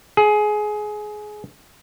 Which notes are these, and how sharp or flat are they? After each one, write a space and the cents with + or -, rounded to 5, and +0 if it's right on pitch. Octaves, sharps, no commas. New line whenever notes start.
G#4 +20